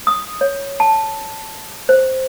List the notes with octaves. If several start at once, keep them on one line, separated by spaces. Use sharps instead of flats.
D#6
C#5
A5
C5